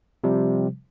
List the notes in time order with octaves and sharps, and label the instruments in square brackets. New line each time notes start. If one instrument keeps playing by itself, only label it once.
[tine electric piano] C3 F3 G3